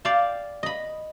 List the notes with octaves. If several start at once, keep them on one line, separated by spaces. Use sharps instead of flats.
D5 F5 G5 A5
D#5 B5